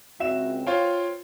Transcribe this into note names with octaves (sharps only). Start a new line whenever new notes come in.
C#2 C4 F#4 E5 E7
F4 C5 C#5 F5 G5